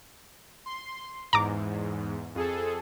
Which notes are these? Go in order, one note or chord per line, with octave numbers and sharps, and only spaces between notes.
C6
E2 G#2 A#5 D6
F2 G#4 A4